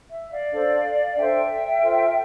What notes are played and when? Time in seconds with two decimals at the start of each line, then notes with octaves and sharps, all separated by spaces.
0.09 E5
0.30 D5 F5
0.52 D4 A4 C5
1.16 D4 A4 C5 E5 G5
1.81 F4 A4 C5